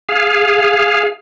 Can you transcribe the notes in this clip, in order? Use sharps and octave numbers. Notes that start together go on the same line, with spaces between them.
G#4 F5